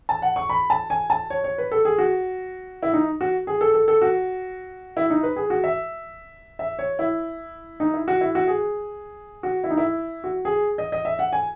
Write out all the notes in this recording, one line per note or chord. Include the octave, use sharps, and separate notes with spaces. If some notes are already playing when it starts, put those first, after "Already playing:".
A5
F#5
C#6
B5
A5
G#5
A5
C#5
C#5
B4
A4
G#4
F#4
E4
D#4
F#4
G#4
A4
A4
A4
F#4
E4
D#4
B4
G#4
F#4
E5
E5
C#5
E4
D#4
E4
F#4
E4
F#4
G#4
F#4
E4
D#4
E4
F#4
G#4
D#5
D#5
E5
F#5
G#5